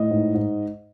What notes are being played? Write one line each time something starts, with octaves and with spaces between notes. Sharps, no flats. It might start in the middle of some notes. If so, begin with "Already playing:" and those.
Already playing: A2 D#5
G#2
G#2